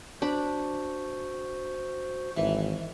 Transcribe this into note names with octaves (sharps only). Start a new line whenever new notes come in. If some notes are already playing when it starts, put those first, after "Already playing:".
D4 F#4 C5 B5
G#1 E3